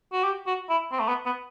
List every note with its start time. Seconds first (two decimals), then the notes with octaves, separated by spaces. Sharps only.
0.13 F#4
0.24 G4
0.47 F#4
0.70 E4
0.92 C4
1.00 A3
1.08 B3
1.26 B3